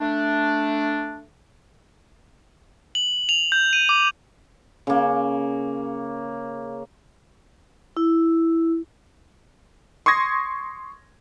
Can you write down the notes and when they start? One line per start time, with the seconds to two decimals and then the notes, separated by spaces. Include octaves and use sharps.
0.01 A3 D4
2.95 F#7
3.29 F7
3.52 G6
3.73 D#7
3.89 D6
4.87 C#3 A#3
7.97 E4
10.06 C6 C#6 D#6 G#6 A#6